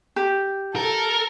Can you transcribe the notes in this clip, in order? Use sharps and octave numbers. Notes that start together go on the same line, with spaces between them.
G4
A4 A#4